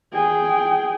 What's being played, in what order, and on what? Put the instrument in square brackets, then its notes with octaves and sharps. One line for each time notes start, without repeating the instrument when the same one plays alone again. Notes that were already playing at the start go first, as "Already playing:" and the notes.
[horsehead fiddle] G#4 G5